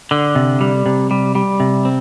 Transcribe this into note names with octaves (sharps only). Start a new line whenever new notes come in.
D3
C3
G3
C3
G3
G3
C3
C4